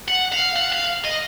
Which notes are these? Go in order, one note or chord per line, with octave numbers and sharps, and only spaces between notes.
F#5
F5
F#5
F5
D#5